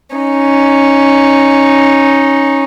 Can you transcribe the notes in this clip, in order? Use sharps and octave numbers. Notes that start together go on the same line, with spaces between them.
C#4 D#4